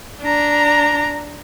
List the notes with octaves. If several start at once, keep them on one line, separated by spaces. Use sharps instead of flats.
D4 A#5